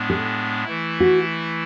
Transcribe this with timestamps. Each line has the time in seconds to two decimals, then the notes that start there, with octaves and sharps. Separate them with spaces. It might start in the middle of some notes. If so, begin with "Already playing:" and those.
Already playing: A2 G#3 B3 D4
0.10 G#4
0.64 E3 A3 E4
1.00 F#4